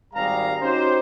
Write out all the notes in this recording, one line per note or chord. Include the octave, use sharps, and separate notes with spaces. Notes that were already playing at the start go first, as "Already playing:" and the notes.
G#1 G3 G4 G#4 F5 A#5
C#4 D#4 F#4 G4 C5